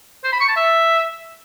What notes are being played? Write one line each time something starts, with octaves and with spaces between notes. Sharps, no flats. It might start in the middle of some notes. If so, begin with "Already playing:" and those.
C5
B5
C#6
A5
E5